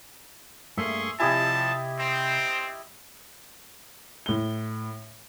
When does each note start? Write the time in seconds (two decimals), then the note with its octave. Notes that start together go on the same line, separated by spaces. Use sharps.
0.77 G2 A3 A#3 G#4 E5 C6 C#6
1.20 C3 F3 E4 G4 D5 D#5 G#5 A5
1.99 C4 C5 G5 A#5
4.26 A2 G7